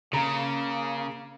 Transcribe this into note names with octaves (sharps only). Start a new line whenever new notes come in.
C#3 A#3 A#5